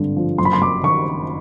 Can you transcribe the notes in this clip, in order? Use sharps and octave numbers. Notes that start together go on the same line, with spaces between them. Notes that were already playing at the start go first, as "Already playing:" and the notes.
Already playing: G#1 G2 D3
F3
F#1 C6
B5
C6
F#2 D6
D#3 C#6